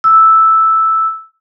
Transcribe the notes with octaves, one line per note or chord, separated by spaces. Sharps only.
E6